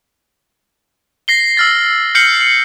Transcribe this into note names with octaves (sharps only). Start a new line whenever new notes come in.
A#6 C7 G7
E6 F6 A6
F6 G6 C7 C#7 F#7 G7